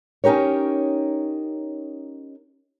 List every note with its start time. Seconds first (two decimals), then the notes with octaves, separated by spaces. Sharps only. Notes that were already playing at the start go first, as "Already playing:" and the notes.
0.24 C#4 D#4 G4 A#4 C#5